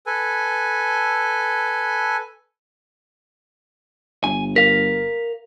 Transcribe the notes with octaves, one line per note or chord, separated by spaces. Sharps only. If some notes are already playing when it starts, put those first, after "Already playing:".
A4 B4 G#5
G1 G#5
A#4 F5 B6